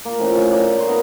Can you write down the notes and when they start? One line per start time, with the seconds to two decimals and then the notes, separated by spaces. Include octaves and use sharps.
0.05 A#3
0.19 A2 F3 C#4
0.31 C#6
0.52 A#4 D5
0.75 A#3 C#5 C6
0.88 B3 D#4 A#4